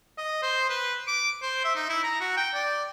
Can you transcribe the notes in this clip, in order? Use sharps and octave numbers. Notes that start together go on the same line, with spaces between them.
D#5
C5
B4
D6
C5
E5
D#4
E4
A#5
F#4
G5
D5